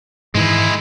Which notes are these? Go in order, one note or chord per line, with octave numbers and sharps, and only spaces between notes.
G#2 D#3 E3 G#3 E4